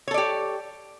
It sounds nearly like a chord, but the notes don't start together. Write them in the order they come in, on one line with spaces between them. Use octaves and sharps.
C#5 A4 D5 G4